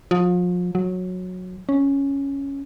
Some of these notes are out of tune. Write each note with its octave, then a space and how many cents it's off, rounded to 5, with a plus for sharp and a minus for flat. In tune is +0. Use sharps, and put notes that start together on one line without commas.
F3 +35
F#3 -15
C#4 +0